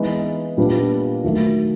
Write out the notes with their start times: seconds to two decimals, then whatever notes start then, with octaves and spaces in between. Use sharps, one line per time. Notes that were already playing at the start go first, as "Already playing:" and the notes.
Already playing: E3 G#3 B3 D#4
0.57 A#2 G3 B3 D4
1.24 D#3 F#3 A3